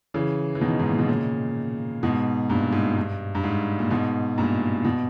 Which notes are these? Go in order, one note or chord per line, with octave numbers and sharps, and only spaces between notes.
C#3 E3
E3
B2 D#3
G#2
A#2
B2
A#2 C#3
G#2 B2
G2 A#2
G#2
G2
G2
G#2
A#2
G#2 B2
G2 A#2
B2